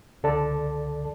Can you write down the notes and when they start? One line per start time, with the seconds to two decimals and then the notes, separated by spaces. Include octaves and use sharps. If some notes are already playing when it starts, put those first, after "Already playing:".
0.23 C#2 D3 A4 D5 A5